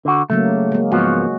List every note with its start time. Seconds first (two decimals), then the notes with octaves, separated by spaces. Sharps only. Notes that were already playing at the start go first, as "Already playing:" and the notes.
0.05 D3 F#4
0.30 C#3 F#3 A3 A#3
0.72 G#3 A#3
0.92 G#2 F3 B3 F#4